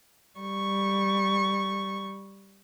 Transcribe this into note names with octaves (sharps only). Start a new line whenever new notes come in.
G3 C#6